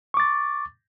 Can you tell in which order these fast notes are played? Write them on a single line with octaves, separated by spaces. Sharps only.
C#6 D6 A6